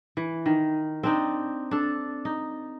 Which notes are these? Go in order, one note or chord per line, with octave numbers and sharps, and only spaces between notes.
E3
D#3
C4 D4 D#4
D4 A4
D#4